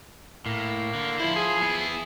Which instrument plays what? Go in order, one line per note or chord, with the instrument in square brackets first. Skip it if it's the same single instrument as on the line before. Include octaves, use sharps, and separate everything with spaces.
[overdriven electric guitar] A2 [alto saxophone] A#3
[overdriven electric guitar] D3
[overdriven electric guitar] F3 C5 [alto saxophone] E4
[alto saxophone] G#4
[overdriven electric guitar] B3 E4